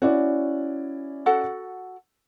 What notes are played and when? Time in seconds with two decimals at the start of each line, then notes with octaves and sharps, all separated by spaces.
0.02 C#4 E4 F#4 D5
1.26 F#4 A4 F#5